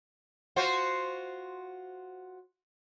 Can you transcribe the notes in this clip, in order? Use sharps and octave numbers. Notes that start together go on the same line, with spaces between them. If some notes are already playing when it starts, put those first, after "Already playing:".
F4 F#4 C5